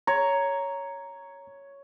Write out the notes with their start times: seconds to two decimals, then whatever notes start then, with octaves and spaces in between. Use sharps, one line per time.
0.07 C#5 A#5